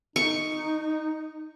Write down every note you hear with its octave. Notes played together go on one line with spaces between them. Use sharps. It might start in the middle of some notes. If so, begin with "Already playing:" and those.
D#4 C#6